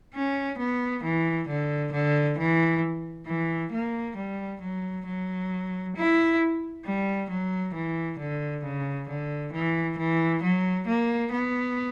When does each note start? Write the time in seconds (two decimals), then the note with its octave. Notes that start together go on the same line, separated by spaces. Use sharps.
0.15 C#4
0.58 B3
1.03 E3
1.48 D3
1.92 D3
2.38 E3
3.27 E3
3.72 A#3
4.17 G3
4.61 F#3
5.06 F#3
5.96 E4
6.85 G3
7.30 F#3
7.74 E3
8.19 D3
8.64 C#3
9.09 D3
9.53 E3
9.98 E3
10.43 F#3
10.88 A#3
11.32 B3